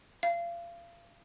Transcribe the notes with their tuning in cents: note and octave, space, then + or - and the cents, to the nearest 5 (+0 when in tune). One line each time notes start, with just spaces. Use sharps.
F5 -30